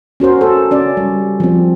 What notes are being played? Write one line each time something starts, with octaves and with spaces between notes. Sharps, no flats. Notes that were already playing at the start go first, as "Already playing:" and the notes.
C#4 F#4 A#4 C5
A4
C#4 D5
G3
F3 C4